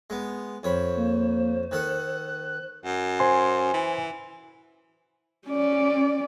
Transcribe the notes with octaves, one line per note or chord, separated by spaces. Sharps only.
G#3 B3
F2 C5 C#5 B5
A#3
D#3 A4 F#5 F#6
F#2
C5 G#5 C6
E3
C#4 D5